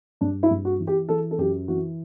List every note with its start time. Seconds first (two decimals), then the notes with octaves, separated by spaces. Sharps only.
0.21 G2 D4
0.43 E4
0.50 G2
0.65 F#4
0.80 E3
0.87 G4
1.09 E3 A4
1.31 A4
1.38 F#2 G4
1.68 E3 F#4